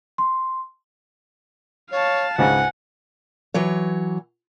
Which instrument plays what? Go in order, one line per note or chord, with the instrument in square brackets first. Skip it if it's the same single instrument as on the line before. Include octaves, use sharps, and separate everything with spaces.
[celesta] C6
[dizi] C#5 [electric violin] F5 A5
[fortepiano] C#2 G#2 C#3 [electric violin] F#5 [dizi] G#5
[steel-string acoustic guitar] E3 F#3 C#5